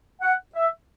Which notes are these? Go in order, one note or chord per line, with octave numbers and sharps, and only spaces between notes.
F#5
E5